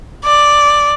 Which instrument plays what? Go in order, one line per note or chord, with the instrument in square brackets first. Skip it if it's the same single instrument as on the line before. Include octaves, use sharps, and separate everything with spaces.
[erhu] D5